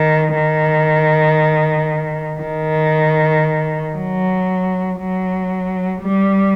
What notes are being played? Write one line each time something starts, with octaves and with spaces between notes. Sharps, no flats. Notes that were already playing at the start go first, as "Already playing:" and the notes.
Already playing: D#3
D#3
D#3
F#3
F#3
G3